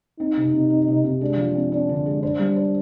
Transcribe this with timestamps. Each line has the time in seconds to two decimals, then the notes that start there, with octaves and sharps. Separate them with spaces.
0.20 C4 D#4
0.37 C3
0.54 C3
0.70 C4
0.88 C3
1.04 C3
1.21 G#3 D4
1.38 F3
1.55 C4
1.72 C4 D4
1.89 D3
2.06 G#3
2.23 D4 C5
2.39 G3
2.56 C5